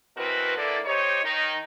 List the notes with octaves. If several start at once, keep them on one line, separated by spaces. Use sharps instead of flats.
B2 E3 C4 F#4 A#4 B4
D3 A#3 E4 A4 D5
D#4 G4 C5 C#5
D#3 D#4